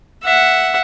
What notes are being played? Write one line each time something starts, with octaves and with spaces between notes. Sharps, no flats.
E5 F#5